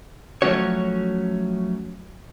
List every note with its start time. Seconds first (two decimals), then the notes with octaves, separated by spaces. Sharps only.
0.42 F3 F#3 A3 C#4 F#4 C#5